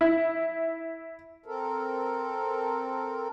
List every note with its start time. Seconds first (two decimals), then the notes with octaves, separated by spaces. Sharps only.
0.01 E4
1.46 C4 A4 A#4